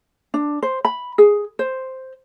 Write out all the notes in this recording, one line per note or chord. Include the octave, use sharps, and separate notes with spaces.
D4
C5
B5
G#4
C5